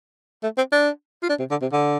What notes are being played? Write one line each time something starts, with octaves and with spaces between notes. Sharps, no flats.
A3
C4
D4
F4
D4
C3
D3
C3
D3